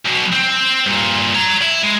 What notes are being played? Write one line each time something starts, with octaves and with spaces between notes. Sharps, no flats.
B1 B2
C4
G2 A#2
C#5 A#5
E4
G#3